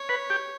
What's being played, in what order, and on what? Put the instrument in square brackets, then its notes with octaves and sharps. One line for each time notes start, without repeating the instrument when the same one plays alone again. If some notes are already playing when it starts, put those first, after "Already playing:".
Already playing: [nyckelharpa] C#5
[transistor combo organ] B4
G4